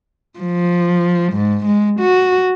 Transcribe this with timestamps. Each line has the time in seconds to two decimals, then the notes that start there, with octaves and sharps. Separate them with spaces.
0.39 F3
1.33 G#2
1.67 G#3
2.00 F#4